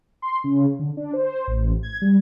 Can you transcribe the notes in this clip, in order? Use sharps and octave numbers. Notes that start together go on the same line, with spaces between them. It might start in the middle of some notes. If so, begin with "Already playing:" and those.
C6
C#3
D3
D4
C5
A1
G#6
G3